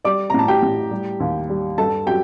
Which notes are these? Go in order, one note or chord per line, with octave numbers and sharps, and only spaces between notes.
G3 D5 D6
A#5
A2 A5
G4 G5
A2
G3
D#2
G3
G2 A4 A5
F#3 G4 G5